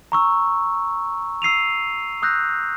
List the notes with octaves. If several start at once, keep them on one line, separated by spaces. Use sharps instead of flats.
A#5 C#6 E6
E6 C7 D#7 F7
D#6 E6 F#6 G6 A#6